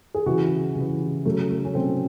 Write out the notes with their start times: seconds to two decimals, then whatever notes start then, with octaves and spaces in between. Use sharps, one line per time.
0.14 G#4
0.26 C#3 E3 F#4
0.76 C#3 E3
1.25 C#3 F#3 A3
1.50 A3
1.64 C#4
1.75 C#3 F#3 C4